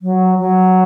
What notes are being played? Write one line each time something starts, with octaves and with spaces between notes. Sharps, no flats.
F#3
F#3